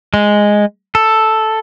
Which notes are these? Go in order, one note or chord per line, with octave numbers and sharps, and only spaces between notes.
G#3
A4